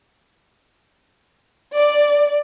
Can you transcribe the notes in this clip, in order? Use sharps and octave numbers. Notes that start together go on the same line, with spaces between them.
D5